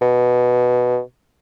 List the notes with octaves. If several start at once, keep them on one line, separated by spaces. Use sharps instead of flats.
B2